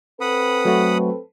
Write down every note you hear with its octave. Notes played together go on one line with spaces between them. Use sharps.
C4 A4 B4 F#5 B5 D#6
F#3 A3 F#4